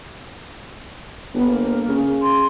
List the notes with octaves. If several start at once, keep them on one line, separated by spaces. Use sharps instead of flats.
G1 B3
A#3
C#3
C6